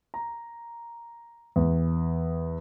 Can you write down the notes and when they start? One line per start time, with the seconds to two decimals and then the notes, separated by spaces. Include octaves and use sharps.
0.14 A#5
1.56 E2